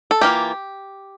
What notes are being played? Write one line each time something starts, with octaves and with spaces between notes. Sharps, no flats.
A4
E3 A#3 F4 G4